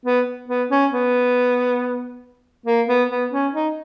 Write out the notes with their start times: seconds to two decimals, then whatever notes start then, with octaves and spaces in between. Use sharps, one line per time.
0.05 B3
0.48 B3
0.71 C#4
0.92 B3
2.66 A#3
2.88 B3
3.10 B3
3.32 C#4
3.53 D#4